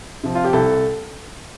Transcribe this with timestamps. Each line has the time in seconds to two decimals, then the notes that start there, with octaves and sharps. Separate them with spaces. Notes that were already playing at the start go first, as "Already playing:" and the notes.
0.24 C3 F3
0.35 F4
0.45 G4
0.53 C2 A4